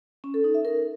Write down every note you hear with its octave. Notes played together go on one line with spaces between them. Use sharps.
C#4
A4
D#4
E5
A#4